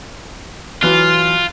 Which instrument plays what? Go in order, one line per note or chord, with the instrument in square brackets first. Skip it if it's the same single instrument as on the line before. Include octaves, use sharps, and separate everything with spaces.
[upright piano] E3 F#3 F#6 [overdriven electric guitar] F4